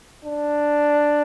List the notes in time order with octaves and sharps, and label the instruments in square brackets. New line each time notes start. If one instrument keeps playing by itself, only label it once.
[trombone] D4